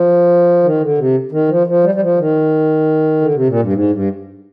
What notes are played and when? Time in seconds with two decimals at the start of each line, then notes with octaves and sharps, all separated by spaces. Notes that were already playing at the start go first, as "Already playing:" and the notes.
Already playing: F3
0.64 D#3
0.81 D3
0.98 C3
1.32 D#3
1.49 F3
1.67 F3
1.84 G3
1.95 G3
2.01 F3
2.18 D#3
3.21 D3
3.34 C3
3.47 A#2
3.60 G2
3.73 G#2
3.91 G2